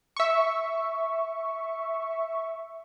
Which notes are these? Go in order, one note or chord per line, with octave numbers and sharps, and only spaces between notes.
E5 C#6